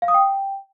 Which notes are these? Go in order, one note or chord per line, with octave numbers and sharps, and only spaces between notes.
F5
D#6
G5